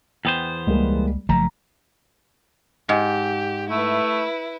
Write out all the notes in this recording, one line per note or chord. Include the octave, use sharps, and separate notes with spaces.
E2 B3 C5 G5
C#2 G3 G#3 A#3
F#1 F3 A3 A#5
G#2 G4
A3 E4 B4